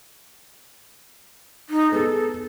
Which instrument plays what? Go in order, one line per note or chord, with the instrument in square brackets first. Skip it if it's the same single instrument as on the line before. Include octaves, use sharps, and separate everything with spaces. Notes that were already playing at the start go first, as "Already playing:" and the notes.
[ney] D#4
[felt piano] B3 G#4 [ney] A4